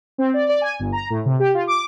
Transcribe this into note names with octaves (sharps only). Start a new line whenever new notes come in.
C4
D5
D5
G#5
G1
A#5
A2
C3
G4
F4
D6